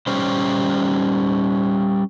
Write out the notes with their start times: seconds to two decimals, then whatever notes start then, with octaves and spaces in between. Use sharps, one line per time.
0.07 G3 C#4 C5